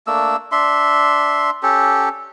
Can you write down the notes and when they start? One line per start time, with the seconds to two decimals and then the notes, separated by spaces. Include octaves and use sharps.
0.07 A3 A#3 D4 E6
0.52 D4 E5 C6
1.63 C#4 G4 A4